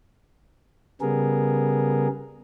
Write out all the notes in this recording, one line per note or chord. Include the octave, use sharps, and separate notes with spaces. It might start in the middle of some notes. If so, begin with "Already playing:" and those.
C#3 G3 B3 G#4 A#4